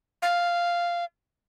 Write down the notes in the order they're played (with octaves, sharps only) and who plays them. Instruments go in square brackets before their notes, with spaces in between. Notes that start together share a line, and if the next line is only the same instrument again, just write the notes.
[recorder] F5